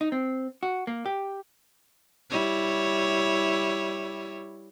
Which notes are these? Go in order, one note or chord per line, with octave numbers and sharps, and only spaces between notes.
D#4
C4
F#4
A#3
G4
G3 E4 C#5